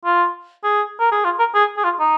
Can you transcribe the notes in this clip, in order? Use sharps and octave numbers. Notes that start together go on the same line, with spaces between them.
F4
G#4
A#4
G#4
F4
A#4
G#4
G#4
F4
D#4